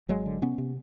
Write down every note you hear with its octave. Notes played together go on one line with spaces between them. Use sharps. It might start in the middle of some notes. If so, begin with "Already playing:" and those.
G#1 F#3 G#3
D3
C3 B3 C#4
C3